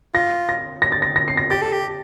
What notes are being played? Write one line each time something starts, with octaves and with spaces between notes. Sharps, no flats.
F4 A#6
A#6
A#6
A6
A#6
A#6
C7
A#6
G4 A6
A4
G4